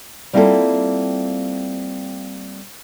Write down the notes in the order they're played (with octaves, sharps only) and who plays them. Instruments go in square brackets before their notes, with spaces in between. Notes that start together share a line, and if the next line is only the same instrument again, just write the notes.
[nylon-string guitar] G3 A#3 C4 E4 F4 A4